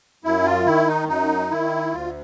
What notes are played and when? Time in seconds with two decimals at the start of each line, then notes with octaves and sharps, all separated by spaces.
0.24 F#2 E4
0.46 F4
0.66 D#3 E4
0.88 D#4
1.08 F#2 D#4
1.51 D#3 E4
1.93 D2 F4